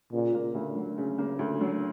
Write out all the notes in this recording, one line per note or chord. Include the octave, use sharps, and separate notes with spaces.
A#2 C#3
A#3
D2
F#3
C#3
A#3
D2
F#3